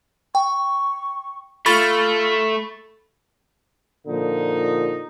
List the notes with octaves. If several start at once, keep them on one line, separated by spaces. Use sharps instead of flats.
G5 C#6
A3 F4 B5 C#6 A6
A#2 D3 F3 D#4